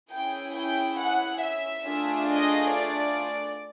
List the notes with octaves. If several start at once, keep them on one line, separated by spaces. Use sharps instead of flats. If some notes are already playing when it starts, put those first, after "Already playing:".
C#4 E4 G#4 G5
G5
F#5
E5
A3 D4 F4 G#4
D#5
D5